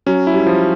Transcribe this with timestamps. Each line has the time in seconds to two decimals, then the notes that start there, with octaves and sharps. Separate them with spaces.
0.06 F#3 C#4
0.27 E4
0.33 G3
0.47 F3